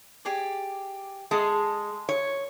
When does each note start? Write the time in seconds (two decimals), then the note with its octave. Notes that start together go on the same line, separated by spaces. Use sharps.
0.25 G4 G#4 D5
1.31 G#3 G#4 A4 A5
2.09 C#5